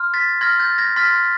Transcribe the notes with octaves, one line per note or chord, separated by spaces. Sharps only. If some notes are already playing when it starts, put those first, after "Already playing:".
Already playing: C6 F6
A6 B6
C6 F6 G#6 A#6
G6 A6
G#6 A#6
C6 F6 A6 B6